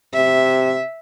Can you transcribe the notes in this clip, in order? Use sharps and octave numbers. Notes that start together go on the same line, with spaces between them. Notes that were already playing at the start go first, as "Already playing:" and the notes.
C3 E5